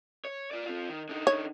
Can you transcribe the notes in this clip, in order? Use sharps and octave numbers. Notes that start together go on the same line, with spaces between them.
C#5
F4 D5
C4 F4
D#3
D3 D#4
C#5